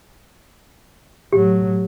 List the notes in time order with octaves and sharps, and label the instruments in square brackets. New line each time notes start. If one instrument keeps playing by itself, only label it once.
[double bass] A2 F#3 [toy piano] G4